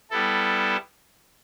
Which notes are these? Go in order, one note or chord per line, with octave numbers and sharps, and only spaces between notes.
G3 B3 E4 A4